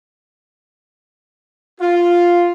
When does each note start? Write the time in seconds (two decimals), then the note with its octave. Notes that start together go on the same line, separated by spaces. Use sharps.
1.79 F4